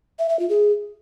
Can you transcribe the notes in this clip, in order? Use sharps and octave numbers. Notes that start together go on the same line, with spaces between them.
E5
E5
F4
G#4